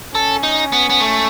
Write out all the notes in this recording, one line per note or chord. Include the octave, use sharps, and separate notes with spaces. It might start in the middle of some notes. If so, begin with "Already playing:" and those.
C#4 A4
D#4
B3
B3
A3